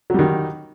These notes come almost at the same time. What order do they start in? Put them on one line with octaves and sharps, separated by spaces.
F#3 G3 D#3